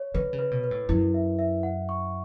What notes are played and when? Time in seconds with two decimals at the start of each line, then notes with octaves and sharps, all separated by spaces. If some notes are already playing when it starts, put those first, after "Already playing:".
Already playing: C#5
0.14 D3 B4
0.33 C#3
0.39 B4
0.51 B2
0.64 B4
0.71 A2
0.89 F#2 E4
1.14 E5
1.39 E5
1.63 F#5
1.89 C#6